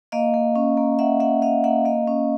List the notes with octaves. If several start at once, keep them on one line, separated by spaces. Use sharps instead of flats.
A#3 D#5 F5
A#3
C#4
A#3
A#3 E5 F#5
A#3 E5 F#5
C#4 D#5 F5
A#3 E5 F#5
A#3 D#5 F5
C#4